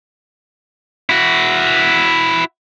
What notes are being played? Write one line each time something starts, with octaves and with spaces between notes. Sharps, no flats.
E4 F#4